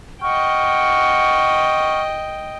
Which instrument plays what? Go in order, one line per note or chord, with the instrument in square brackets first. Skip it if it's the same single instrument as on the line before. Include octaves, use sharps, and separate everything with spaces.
[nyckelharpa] D#5 G5 [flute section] F#5 C#6 F6